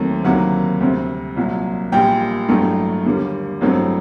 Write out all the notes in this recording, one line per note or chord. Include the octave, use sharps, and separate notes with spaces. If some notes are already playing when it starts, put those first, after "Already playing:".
Already playing: D#2 D#3 F#3 A3 C4
D2 C3 D#3 F#3 A#3 F#5
D2 C3 G3 C4
C2 A#2 F#3
A#1 A#2 G3 G5
A1 G2 F#3 A3
D#2 D3 G3 A#3
A1 G2 F#3 A3 C4